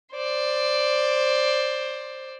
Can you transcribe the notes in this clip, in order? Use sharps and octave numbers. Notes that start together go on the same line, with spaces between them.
C5 D5